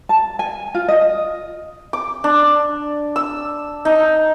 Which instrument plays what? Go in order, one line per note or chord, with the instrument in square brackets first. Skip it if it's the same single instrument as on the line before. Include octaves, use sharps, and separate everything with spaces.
[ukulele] A5
G#5
F4
D#5
[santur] D6
D4
E6
D#4